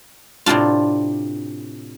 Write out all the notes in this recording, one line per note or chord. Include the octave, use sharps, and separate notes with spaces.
A2 C3 C4 D4 F4